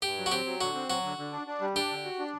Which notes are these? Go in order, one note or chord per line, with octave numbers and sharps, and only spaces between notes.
G2 G4
F#3
F#4
C4 G4
F#3
D3 F#4
C4
F#3 F#4
D3
D3
D4
D4
G3
D4 G4
D3
F#4
D4